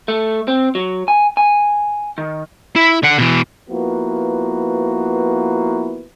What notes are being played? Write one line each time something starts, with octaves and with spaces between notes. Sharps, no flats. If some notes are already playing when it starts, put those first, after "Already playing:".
A3
C4
F#3
G#5
G#5
D#3
E4
D3 F#5
B2 E3
F3 A#3 B3 E4 F#4 B4